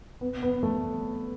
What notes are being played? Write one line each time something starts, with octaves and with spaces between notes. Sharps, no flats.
B3
B3
A3